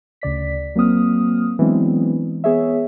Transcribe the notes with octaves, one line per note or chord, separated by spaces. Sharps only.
D2 C#3 D5 B6
F#3 A#3 C4 D#6 F6
E3 F#3 G#3 B3 C4 D4
B3 G#4 C#5 E5